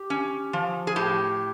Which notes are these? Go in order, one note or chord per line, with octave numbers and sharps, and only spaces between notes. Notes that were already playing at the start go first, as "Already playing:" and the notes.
Already playing: G4
C#4
F3
G#4
A2 G4